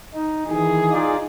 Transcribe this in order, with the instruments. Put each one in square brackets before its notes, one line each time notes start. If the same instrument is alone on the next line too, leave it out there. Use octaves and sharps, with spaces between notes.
[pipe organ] D#4
[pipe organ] D#3 E3 [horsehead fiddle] G#4
[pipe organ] D#4 F4 D5